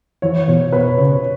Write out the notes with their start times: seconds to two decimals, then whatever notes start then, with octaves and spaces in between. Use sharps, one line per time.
0.22 E3 C#5
0.48 B2 C#5
0.72 B2 B4
0.98 C#3 C#5